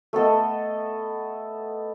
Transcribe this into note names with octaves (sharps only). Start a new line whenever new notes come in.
A3 B3 A4 D#5